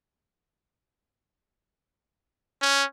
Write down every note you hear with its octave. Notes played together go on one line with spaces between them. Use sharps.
C#4